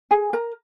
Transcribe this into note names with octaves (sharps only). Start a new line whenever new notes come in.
G#4 G#5
A#4 A#5